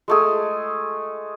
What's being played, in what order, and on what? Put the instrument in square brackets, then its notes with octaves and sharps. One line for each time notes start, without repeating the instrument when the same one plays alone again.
[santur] G#3 A3 G#4